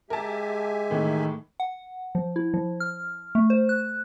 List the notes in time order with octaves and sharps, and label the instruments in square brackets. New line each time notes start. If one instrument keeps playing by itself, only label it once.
[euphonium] G#3 [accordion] G4 E5 G#5 [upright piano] A#4 A5
[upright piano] A2 E3 [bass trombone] D#3
[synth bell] F#5
F3
E4
F3
F6
A3
C5
F#6